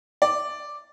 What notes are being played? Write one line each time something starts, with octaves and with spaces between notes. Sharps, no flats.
D5